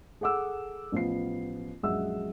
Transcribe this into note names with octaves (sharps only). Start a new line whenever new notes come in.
G#4 A4 F#5 D6 E6
A1 F3 B3 F4 C7
A#1 F#2 G#3 E5 F#5 E6